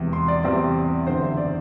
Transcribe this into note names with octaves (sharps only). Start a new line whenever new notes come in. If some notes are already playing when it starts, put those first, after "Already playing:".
Already playing: E1 E2 C3
C6
D5
E2 C3 G3 C4 D5
F#1 E2 D3 C5
E5
D5